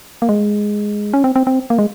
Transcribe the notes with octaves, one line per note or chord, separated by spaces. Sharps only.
A#3
G#3
C#4
C4
C4
C4
A#3
G#3